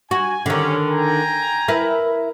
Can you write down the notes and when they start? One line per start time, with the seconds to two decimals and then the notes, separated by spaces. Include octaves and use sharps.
0.11 F#4 G#5
0.46 D3 D#3 C#4 G4
0.89 G5 G#5 A#5
1.68 E4 A#4 B4